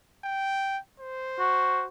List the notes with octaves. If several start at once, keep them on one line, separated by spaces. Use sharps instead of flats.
G5
C5
F#4